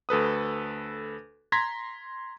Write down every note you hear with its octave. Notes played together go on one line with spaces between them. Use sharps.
D2 A4 B4 D#6
A#5 C6 G#6 A#6 B6